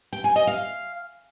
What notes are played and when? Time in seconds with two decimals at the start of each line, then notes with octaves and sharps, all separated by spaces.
0.13 G5
0.24 G#5
0.36 D#5
0.47 F5